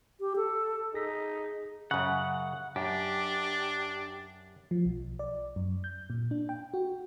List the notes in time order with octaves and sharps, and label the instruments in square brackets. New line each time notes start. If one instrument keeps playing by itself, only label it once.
[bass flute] G4
A4
[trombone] D#4 [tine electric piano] G#4 A#6 B6
[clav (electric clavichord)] F#2 C#3 [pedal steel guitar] F#5
[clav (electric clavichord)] F#2 [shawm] D4 [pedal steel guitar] G4
[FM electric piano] F3
B1
D5
F#2
G6
A#2
D4
G5
F#4